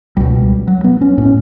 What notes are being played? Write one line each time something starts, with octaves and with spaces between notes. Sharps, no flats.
C#2 B2 G3
G3
F#3
B3
C#4
A2 C#4